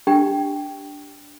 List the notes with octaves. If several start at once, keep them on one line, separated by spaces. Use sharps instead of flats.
D4 G4 G5